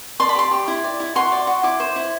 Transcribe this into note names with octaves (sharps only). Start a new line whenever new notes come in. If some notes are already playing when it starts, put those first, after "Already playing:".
D5 C6
B5
G4 C6
G4
E4
D5
E4
F#4 C6
D5
F#4
E4 D6
C5
E4